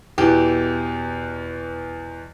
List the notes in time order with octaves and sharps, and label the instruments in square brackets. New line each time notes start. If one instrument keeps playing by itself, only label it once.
[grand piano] E2 B2 E3 [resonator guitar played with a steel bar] G4